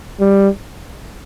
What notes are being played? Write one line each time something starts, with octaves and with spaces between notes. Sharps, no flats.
G3